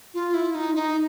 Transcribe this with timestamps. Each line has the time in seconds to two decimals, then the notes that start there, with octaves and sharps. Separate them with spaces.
0.14 F4
0.34 E4
0.55 D#4
0.75 D#4